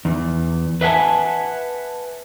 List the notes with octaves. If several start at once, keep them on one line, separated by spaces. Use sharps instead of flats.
E2
B4 E5 F#5 G#5 A5